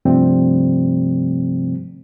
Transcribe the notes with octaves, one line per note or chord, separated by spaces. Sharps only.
G2 C3 F3 G3 A3 C4